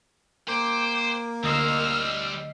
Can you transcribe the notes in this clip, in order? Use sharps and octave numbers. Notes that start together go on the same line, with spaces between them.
A#3 C5 G5 D6
D2 G3 C5 D#5 E6 F6 C7